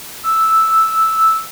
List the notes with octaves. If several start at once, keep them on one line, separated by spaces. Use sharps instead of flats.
E6